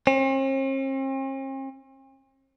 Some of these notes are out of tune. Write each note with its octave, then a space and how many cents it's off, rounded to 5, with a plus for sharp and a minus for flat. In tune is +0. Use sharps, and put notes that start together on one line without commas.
C4 +45